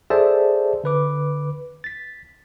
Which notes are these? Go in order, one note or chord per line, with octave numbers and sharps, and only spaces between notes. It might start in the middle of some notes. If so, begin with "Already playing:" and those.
G#4 A4 C5 D5 E5 A5
D3 B4 D6
A6 B6